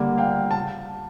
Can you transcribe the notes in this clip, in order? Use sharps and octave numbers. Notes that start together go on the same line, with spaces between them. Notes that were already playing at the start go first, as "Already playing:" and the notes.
Already playing: D3 G3 A#3
F5 G5
A5